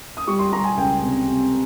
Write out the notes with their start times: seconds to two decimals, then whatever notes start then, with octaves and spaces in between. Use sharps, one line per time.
0.17 D#6
0.27 G3 C#6
0.39 C6
0.52 G3 A#5
0.64 G#5
0.77 C#2 G5
1.03 C3
1.28 C3